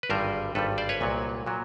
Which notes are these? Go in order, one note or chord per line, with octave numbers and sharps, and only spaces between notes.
B4
G#1 G2 D3 G3 A#4 C5
G#1 G2 D3 G3 A4 B4
C5 D5
B4 C#5
C2 A#2 F#3
A#2 F#3